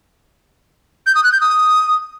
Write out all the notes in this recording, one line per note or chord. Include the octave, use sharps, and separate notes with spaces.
G6
D#6
F#6
G6
D#6